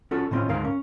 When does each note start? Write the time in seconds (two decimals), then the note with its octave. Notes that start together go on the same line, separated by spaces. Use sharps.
0.11 C#4 F4 F#4 A4
0.31 A2 D#3 C4 C#4 F4
0.49 D2 G#2 A#4 F5
0.64 C#4